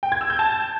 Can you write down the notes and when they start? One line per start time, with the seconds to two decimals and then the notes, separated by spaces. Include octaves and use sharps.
0.03 G5
0.12 G#6
0.21 E6
0.30 G6
0.39 A5